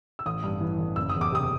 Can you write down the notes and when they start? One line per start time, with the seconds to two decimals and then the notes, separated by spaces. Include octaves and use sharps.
0.19 E6
0.26 A1 D#6
0.44 G2
0.61 E3
0.79 A1
0.96 F#1 E6
1.09 D#6
1.15 E2
1.21 D6
1.32 C3 D#6